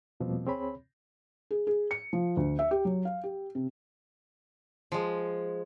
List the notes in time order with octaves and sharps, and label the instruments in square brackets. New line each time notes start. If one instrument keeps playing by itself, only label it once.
[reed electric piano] E2 B2 F3 G3 A#3 C4
D2 C4 G#4 C#5 B5
[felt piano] G#4
G#4
C#7
F3
D2
E5
G4
F#3
F5
G4
C3
[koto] F3 G#3